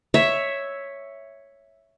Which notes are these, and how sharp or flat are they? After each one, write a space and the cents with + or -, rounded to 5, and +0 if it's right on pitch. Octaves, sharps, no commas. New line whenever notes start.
C#5 +0 E5 +0